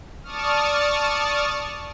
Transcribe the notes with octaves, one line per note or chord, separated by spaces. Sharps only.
D5 A5 C#6 D#6 F6